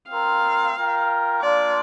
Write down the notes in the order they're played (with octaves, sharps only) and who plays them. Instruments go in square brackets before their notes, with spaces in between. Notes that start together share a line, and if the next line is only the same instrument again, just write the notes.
[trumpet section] C4 F4 A#4 [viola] F5
[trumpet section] F4 A#4 G5
[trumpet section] A#3 D4 F4 [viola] D5